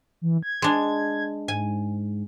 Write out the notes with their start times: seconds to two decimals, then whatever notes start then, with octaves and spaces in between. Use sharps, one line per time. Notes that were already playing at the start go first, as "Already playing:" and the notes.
0.22 E3
0.43 G#6
0.62 G#3 D4
1.48 G#2 G#5